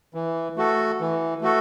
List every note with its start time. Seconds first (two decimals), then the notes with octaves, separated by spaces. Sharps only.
0.14 E3
0.57 A3 F#4 A4
1.00 E3
1.42 A3 F#4 A4